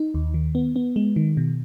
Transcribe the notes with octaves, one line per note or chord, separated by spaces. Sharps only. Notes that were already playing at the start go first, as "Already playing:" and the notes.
Already playing: D#4
D#2
D#3
B3
B3
G#3
D#3
B2